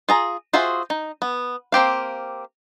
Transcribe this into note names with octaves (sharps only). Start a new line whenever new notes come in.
F4 G#4 A#5
F4 F#4 G#4 C5 E5
D#4
B3
A#3 C4 G4 F5